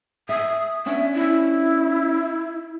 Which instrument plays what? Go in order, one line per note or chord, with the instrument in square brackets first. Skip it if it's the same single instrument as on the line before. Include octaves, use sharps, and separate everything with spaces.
[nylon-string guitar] E5 [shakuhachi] D#6
[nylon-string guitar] B3 C#4 D4 [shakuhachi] E5
[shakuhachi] E4